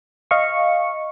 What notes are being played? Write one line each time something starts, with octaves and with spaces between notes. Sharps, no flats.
D#5 F5 C#6